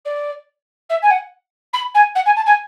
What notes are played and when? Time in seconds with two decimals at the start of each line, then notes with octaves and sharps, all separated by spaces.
0.05 D5
0.89 E5
1.02 G#5
1.10 F#5
1.73 B5
1.94 G#5
2.15 F#5
2.26 G#5
2.36 A5
2.46 G#5